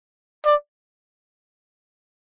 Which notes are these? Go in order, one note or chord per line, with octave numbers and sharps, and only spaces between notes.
D5